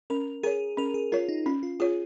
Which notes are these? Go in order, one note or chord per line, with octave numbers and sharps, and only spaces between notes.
C#4 A#4
G#4 A#4 C#5
C#4 A#4
G#4
F4 A#4 C#5
D#4
C#4 F4
F4
F4 G#4 C#5